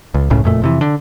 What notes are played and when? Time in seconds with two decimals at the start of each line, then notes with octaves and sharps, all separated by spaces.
0.14 C#2
0.30 F#1 C#2 A2 C#3
0.44 F#1 F2 A#2 A3
0.62 F2 C3 E3
0.81 D3